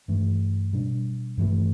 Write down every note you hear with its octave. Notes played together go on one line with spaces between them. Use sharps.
G2 E3 A3
B2 G3 D4
G2 E3 A3